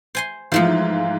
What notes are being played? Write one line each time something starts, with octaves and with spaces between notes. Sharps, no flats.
C5 G#5 C6
G#2 E3 F3 A3 F4 C5